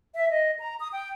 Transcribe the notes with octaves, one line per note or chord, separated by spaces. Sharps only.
E5
D#5
A#5
D#6
G5